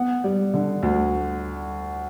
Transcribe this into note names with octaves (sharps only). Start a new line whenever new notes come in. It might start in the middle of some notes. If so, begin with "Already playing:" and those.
Already playing: B3 F#5
G3
D3
D2